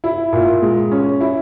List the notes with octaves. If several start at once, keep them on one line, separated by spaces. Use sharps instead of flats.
E4
A#2
G#3
C#4
E4